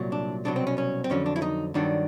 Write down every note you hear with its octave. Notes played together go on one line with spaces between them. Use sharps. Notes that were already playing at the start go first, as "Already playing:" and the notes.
Already playing: C2 A#2 F#3
D4
C2 B2 F#3 D4
C4
C#4
C#4
C4
F2 D3 F#3 C#4
D4
E4
D#4
G2 D#3 F#3 D4